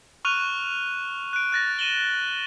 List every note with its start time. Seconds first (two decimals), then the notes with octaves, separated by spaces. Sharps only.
0.25 C#6 F6 F#6 D#7 F7
1.33 F#6 D7
1.52 F#6 A6 A#6
1.79 D#7 E7 F#7 G7